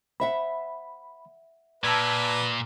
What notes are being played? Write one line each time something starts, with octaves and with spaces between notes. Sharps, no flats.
C5 E5 F#5 B5
A#2 B4 D5 A5 E6 G#6